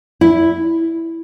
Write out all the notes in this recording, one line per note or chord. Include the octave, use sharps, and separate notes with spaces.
E4